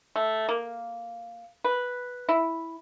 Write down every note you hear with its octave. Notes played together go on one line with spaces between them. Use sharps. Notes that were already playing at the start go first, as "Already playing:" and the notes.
A3
A#3
B4
E4